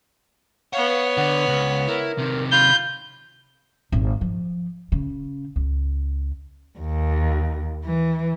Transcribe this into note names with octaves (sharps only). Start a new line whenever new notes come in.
B3 C#5 F5 F#5
D3 F#5
C#2
E4 A#4
C3 D#3
F4 B5 G6
G#1
F3
C#3
C#2
D#2
E3